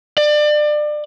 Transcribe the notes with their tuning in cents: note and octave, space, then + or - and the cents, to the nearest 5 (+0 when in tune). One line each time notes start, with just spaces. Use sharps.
D5 +30